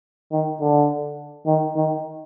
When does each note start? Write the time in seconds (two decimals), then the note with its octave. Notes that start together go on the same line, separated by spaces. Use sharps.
0.32 D#3
0.61 D3
1.46 D#3
1.75 D#3